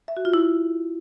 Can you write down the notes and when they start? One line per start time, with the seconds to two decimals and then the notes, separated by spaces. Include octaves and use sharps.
0.08 E5
0.17 F#4
0.25 F4
0.33 E4